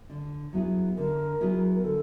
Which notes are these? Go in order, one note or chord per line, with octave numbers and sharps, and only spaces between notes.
D3
F#3 B3 E4 G#4
D3 A#4
F#3 B3 E4 G#4
A#4
D3 A4